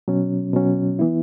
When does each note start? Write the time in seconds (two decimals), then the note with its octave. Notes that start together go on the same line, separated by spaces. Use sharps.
0.08 B2 F#3 C#4
0.53 B2 F#3 C#4
0.99 E3 B3 E4